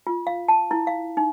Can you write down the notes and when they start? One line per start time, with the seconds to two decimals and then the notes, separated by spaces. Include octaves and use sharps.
0.07 F4
0.27 F5
0.48 A5
0.71 E4
0.87 F5
1.17 D#4